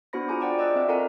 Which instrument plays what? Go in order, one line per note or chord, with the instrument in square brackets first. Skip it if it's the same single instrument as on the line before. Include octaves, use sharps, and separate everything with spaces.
[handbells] B3 D4 F#4 C5 B5 A#6
F4 F#4 G#4 G#5 A#5 D6
C5 D5 F#5 G5 A5 D6
D5 D#5 D6 E6 F#6
C4 E5
F4 A4 A#4 F#5 G#5 A#5